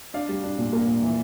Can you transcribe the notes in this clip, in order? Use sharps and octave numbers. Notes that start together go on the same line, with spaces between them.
D4 D5 F5
G3
D4
A#2
A#3
A#2
E3